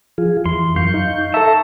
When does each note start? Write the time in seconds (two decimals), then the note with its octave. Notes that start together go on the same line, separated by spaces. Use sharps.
0.18 F3 F4 G#4
0.46 F2 E3 C6
0.76 F#2 F5 C#6 G6
0.94 D#4
1.34 A4 E5 A5 A#5 C#6